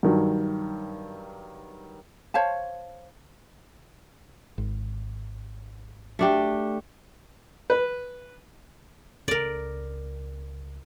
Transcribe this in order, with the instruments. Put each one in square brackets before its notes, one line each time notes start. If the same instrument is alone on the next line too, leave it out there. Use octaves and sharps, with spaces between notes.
[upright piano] G2 D#3 F#3
[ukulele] C5 C#5 F5 A5
[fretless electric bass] G#1
[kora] A3 D4 G4
[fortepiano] B4
[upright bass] C#2 [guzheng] A#4 D5